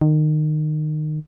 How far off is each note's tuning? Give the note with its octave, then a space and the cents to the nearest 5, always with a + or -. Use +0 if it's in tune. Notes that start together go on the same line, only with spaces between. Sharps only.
D#3 -25